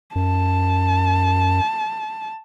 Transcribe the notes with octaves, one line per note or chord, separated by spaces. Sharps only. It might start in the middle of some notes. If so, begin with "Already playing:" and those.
F#2 A5